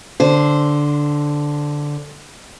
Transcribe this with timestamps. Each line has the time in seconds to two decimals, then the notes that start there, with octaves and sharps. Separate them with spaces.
0.20 D3 C5